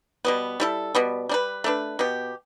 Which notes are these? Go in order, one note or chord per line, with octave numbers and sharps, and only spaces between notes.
B2 G3 B3
G3 E4 A4
B2 G3 B3
G3 D4 B4
A3 D4 B4
B2 B3 G4